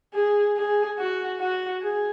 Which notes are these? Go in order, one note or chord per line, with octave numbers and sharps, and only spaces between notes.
G#4
G#4
F#4
F#4
G#4